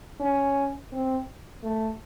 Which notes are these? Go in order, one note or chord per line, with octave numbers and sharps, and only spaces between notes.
C#4
C4
A3